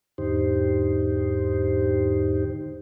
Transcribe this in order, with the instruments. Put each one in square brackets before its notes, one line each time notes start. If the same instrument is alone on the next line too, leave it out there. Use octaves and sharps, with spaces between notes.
[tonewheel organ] E2 G#2 D3 D#4 G4 C5